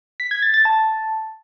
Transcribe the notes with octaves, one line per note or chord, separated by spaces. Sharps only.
B6
G#6
A6
A6
A5